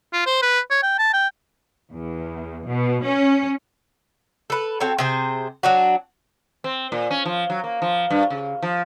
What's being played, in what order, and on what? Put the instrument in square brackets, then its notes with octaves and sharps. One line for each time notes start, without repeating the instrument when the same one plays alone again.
[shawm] F4
C5
B4
C#5
G5
A5
G5
[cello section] E2
B2
C#4
[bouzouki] A4 B4
C4 F#4 A4 C#5
C3 G#4 C5
F#3 D4 F#4
[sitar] C4
A#2
C#4
F3
F#3
A#3
F3
G2
C#3
F3